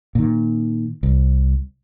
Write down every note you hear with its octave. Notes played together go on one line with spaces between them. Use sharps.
A#2 D#3
C2